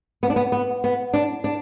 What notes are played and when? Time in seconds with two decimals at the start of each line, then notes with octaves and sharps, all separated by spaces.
0.23 B3
0.30 D4
0.36 B3
0.52 B3
0.84 B3
1.13 D4
1.44 D4